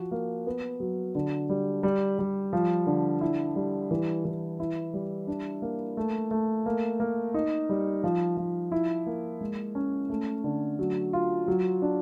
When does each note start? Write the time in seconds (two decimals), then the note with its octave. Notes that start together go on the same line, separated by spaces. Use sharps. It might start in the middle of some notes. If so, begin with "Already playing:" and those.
Already playing: F3 F#4
0.11 A#3
0.47 B3
0.80 F#3
1.15 D3
1.49 G3
1.83 G3
2.19 G3
2.53 F3
2.87 D3
3.21 E4
3.56 G3
3.91 E3
4.25 E3
4.60 E4
4.94 G3
5.27 D4
5.62 A#3
5.97 A3
6.31 A3
6.66 A#3
7.00 A#3
7.34 D#4
7.69 G3
8.04 F3
8.37 F3
8.72 E4
9.06 A#3
9.41 G#3
9.75 C#4
10.10 A3
10.44 D3
10.79 F#3
11.13 F4
11.48 F#3
11.82 D4